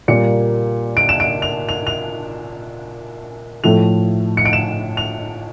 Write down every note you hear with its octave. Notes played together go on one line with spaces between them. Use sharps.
A#2 G3 A#3 C#7
D7
E7
D7
F7
F7
F7
A2 F3 A3 F7
C#7
D7
E7
F7